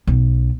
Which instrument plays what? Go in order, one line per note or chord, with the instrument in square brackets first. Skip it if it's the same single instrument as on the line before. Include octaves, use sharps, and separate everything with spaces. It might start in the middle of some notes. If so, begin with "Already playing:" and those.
[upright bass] B1